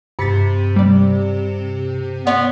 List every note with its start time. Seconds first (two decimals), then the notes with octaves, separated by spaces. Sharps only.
0.19 G2 C3 A6 B6 C#7
0.76 G3 D5
2.27 B3 C#5 D5 C6